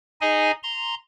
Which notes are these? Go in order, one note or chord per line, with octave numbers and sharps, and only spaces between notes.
D#4 G#4 D#5 G#5
A#5 C6